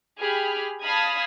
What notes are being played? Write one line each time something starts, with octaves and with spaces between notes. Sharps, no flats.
G4 G#4 B5 F6
F5 A5 B5 D#6 F6 G#6